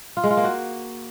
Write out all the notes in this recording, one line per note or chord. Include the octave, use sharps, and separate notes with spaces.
F4
G#3
F4
A#3
F#4